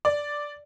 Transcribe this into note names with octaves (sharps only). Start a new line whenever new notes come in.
D5